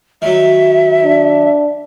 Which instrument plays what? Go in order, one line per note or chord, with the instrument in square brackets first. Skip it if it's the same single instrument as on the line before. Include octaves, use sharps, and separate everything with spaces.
[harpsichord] D#3 F#3 [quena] E5
[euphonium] D4